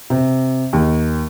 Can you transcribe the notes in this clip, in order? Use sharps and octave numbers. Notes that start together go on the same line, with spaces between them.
C3
D#2